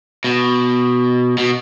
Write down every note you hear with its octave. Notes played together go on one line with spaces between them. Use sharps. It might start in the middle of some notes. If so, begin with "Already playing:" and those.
B2
B2